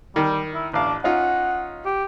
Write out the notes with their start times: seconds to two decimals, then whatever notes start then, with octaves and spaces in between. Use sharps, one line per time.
0.16 D#3 G3
0.54 E4
0.73 A1 D4 F5
1.04 C#4 D#4 F4 F#5
1.85 G4